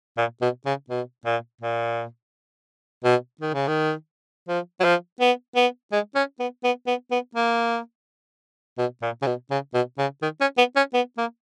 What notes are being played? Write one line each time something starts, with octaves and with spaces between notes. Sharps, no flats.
A#2
B2
C#3
B2
A#2
A#2
B2
D#3
C#3
D#3
F3
F#3
F3
B3
B3
G#3
C#4
B3
B3
B3
B3
A#3
B2
A#2
C#3
B2
C#3
B2
C#3
D#3
C#4
B3
C#4
B3
A#3